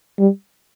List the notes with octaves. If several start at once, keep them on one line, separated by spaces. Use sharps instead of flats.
G3